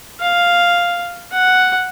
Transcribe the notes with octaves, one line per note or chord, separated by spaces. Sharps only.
F5
F#5